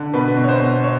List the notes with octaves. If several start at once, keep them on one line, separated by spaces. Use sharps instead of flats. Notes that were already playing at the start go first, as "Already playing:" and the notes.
Already playing: D3
B2 B4
B2
C#5
C5
B2
C#5